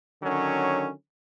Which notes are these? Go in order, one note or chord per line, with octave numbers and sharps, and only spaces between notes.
D3 D#3 F#3 C#4